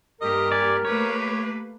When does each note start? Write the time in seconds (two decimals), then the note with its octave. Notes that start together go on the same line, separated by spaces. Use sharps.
0.21 G2 A#3 G4 A#4 D#5
0.52 D5 G#5
0.85 A3 A#3 G4 B4 C#5